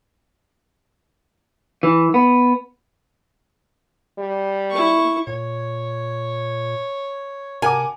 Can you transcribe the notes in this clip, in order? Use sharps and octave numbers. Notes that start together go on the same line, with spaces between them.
E3
B3
G3
E4 C#6
A#2 C#5
C3 A#4 F#5 G#5 D6